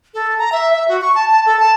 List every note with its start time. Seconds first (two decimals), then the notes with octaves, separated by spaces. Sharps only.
0.14 A4
0.39 A#5
0.52 E5
0.73 E5
0.88 F#4
1.01 C#6
1.15 A5
1.31 A5
1.46 A4
1.60 A5